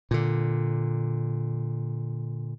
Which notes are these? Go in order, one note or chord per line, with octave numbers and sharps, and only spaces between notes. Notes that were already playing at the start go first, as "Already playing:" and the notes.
A#2 D3